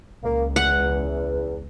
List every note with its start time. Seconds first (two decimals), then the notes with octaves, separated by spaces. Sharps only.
0.24 C#2 A#3
0.56 E2 F#5